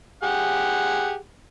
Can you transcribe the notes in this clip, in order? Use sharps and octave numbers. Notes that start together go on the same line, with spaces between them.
G4 G#4 F#5